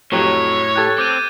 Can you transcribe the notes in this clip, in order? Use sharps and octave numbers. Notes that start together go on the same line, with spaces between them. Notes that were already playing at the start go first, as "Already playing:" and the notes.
F2 A2 F#3 G4 C#5
G4 A4 F#6 G#6 A6
C4 D6 G6 D#7